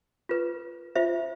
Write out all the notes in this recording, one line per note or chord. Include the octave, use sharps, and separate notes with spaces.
F4 B4
F4 C5 E5